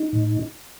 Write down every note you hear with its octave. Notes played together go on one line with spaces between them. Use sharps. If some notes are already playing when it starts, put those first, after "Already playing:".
Already playing: D#4
A2